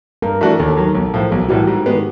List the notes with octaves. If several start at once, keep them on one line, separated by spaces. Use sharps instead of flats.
G2 A#4
E3 A3 D4 F#4
D#2 A4
D#3 F#3
B1
A2 F3
B1 G#4
A2 E3 G3 F#4
G#2 G4
D#3 G#3 B3